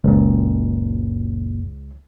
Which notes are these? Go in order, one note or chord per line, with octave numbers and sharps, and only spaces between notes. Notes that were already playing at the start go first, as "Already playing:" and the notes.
F#1 C#2 A#2